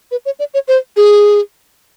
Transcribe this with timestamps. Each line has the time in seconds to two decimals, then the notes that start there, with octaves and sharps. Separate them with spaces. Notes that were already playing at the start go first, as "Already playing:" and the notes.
0.11 B4
0.26 C#5
0.39 D5
0.54 C#5
0.68 C5
0.97 G#4